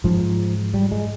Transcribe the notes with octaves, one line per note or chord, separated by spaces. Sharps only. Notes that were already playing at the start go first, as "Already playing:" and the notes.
G#2 F3
G3
G#3